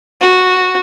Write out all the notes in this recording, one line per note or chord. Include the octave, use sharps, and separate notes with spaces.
F#4